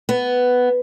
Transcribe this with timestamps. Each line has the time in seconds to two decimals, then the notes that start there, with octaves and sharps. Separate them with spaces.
0.09 B3